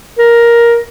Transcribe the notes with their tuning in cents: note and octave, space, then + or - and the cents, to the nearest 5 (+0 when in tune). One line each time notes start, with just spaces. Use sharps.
A#4 +10